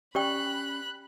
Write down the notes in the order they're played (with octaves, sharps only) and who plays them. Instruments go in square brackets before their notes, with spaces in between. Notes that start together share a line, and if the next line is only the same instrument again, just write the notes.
[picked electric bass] C#4 [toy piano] G4 D5 G5 [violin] B5 F#6